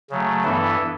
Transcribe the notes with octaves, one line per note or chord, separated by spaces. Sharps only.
C#3 F#3 A3
G2 E3 B3 E4 A4